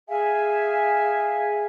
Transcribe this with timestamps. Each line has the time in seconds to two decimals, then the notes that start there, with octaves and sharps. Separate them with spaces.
0.08 G#4 E5 F5 G#5